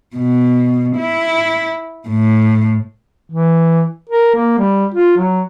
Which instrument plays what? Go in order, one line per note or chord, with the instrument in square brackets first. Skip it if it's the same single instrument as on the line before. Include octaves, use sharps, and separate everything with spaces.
[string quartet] B2
E4
A2
[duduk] E3
A#4
A#3
G3
F4
F#3